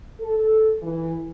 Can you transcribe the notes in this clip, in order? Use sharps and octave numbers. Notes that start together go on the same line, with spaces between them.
A4
E3